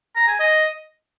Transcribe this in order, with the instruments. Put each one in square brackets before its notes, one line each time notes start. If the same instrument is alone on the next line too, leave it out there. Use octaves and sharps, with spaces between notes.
[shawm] A#5
G#5
D#5